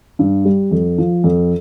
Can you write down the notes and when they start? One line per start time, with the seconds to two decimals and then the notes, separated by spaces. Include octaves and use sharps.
0.19 G2
0.45 G3
0.71 F2
0.98 F3
1.24 F2